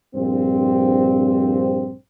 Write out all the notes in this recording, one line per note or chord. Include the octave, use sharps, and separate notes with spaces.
A#1 G2 C4